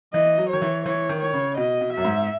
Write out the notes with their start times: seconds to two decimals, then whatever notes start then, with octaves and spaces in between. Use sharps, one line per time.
0.13 E3 D#5
0.38 F#3
0.49 D#3 C#5
0.62 E3
0.85 E3 C#5
1.09 D#3
1.21 C#5
1.33 C#3
1.57 B2 D#5
1.81 B2
1.93 F#2 E5
2.05 G#2